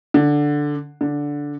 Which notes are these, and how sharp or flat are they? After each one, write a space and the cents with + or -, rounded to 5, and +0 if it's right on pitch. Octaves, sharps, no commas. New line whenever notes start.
D3 +0
D3 -10